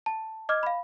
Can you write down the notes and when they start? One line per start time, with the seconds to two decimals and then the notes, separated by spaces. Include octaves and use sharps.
0.06 A5
0.49 D#5 D6 F6 G#6
0.63 F5 B5